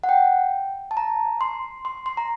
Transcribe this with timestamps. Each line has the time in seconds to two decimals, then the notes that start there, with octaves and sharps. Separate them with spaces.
0.03 F#5
0.09 G5
0.91 A5
0.97 A#5
1.41 C6
1.85 C6
2.06 C6
2.17 A#5